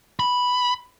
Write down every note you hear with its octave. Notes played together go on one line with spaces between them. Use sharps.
B5